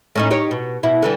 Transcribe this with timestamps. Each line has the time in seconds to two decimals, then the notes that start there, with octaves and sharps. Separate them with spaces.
0.16 A2 C#4 D#4
0.31 D#4 G4 C#5
0.51 B2
0.83 B2 E4
1.02 D3 E3 G3